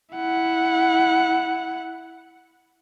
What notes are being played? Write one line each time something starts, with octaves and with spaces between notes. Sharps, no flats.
E4 F#5